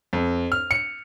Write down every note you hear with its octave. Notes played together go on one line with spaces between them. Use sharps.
F2
F6
C#7